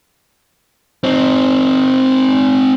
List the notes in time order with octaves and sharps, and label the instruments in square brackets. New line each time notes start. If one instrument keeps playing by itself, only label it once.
[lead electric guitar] C4 D#4